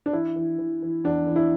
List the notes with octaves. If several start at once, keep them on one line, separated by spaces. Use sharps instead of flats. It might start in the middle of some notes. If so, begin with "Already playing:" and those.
D4
E3 E4
E3
E3
E3
E2 D4
E3
E4